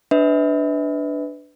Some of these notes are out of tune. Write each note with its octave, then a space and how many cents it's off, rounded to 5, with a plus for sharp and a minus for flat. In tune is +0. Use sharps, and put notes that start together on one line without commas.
D4 +0 B4 +20 E5 -40